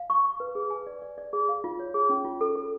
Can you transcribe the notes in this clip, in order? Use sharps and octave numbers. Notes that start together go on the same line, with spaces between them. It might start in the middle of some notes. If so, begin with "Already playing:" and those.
Already playing: F5
C#6
C#6
B4
G#4
G#5
D5
D5
D5
G#4
F5
F4
C#5
G#4
C#4
F4
A4
A4